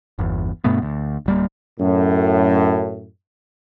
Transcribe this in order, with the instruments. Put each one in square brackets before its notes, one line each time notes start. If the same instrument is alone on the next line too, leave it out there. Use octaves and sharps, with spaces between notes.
[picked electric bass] G1 E2
G2 B2 A3 B3
D2
D1 G3 A#3
[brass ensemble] F#2 A2